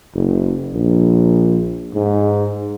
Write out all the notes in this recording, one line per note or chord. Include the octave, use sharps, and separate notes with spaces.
F#1
A#1
G#2